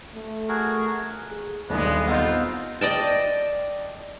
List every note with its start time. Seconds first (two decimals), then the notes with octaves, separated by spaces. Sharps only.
0.15 A3
0.49 F#4 G#4 A#4
1.31 G#4
1.70 D#1 B1 G2 G#3 B3
2.07 B3 C4 D#4 F4
2.81 D5 D#5 G5 A5